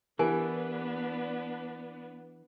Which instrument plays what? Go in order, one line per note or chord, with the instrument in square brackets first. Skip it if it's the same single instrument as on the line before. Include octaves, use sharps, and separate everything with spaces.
[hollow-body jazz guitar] E3 [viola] B3 [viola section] D4 B4 [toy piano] G4 A#4 G#5